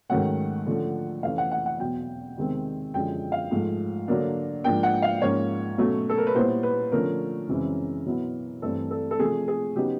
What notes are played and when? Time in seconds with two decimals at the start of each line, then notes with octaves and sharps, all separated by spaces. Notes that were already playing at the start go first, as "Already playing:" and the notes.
0.09 G#2 D#3 F#3 A3 C#4 F#5
0.66 D3 F3 A3 C#4
1.23 F2 C3 E3 A3 C#4 F5
1.38 F#5
1.51 F#5
1.66 F#5
1.80 E2 B2 F#3 G5
2.37 E2 C3 D#3 G#3 C4
2.94 F#2 D3 F3 G#3 G5
3.32 F5
3.51 G#2 F3 A3
4.08 D3 F#3 A#3 D4
4.64 G#2 F3 A#3 D4 G5
4.83 F#5
5.02 F5
5.22 G#2 F3 A#3 C#4 C#5
5.78 B2 F#3 A3 C#4
6.09 A4
6.18 A#4
6.27 B4
6.35 A#2 G3 B3 E4 C5
6.63 B4
6.92 D3 F3 A3 C#4 A#4
7.48 F#2 C#3 E3 G#3 C4
8.06 B2 F#3 B3 E4
8.62 G2 E3 A3 C4 A4
8.91 A4
9.11 A4
9.19 C3 F3 A3 G#4
9.48 G#4
9.76 C#3 F#3 B3 D#4 G4